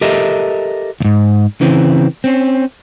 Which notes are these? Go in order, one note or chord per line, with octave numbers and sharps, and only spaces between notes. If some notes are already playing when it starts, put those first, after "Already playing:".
G4 A4 A#4 D#5 E5
D#2 G#2
C#3 E3 C4
C4 C#4